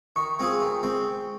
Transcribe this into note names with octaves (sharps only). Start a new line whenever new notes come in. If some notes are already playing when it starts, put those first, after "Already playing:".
D#3 C#6
G#3 C4 F4 G#4
D#3
G#3 C4